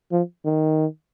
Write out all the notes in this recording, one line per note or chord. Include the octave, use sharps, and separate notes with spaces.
F3
D#3